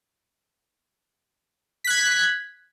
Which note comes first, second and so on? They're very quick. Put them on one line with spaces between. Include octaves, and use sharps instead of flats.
B6 F#6 G#6